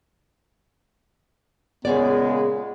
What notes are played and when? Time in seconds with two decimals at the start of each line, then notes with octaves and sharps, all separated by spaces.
1.85 A#2 C#3 G#3 B3 G#4 C#5 D5